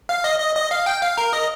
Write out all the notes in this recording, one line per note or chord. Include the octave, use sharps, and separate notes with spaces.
F5
D#5
D#5
D#5
F5
G5
F5
A#4
D#5